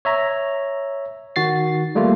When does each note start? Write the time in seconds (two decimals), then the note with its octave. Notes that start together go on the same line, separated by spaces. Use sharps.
0.05 C#5 E5 A#5
1.36 D#3 F#4 A6 C7
1.95 G3 A3 A#3 F4